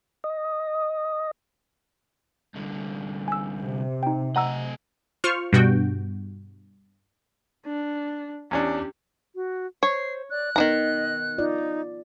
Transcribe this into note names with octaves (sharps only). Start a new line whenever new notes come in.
D#5
C2 D3
G#5 E6
C3
D#4 G5
A3 D#5 F#5 A#5 E6
F4 C5 C#6 F6
G2 B2 F#4 G5
D4
E2 C#4 D4 G4
F#4
C5 C#5 C7
D5 F#6
D#3 F3 B3 D#4 D#5 A#5
D#4 F4 D5